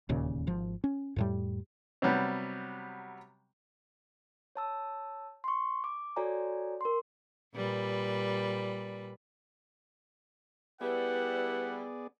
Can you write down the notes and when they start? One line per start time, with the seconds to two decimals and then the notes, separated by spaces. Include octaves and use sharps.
0.09 E1 D#2 A#2 C#3
0.47 G#1 F3
0.84 C#4
1.16 F2 A2 G3
2.02 C3 F#3 G3 B3
4.56 C#5 A5 E6
5.44 C6 C#6
5.84 D6
6.16 F#4 A4 C#5 D5 G#5 A#5
6.81 A#4 C6
7.55 A#2 G3 B4
10.81 G3 B3 E4 G#4 B4 D5 F#5